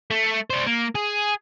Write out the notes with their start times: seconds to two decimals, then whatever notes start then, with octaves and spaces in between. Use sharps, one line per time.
0.11 A3
0.50 D4 C5
0.67 A#3
0.95 G#4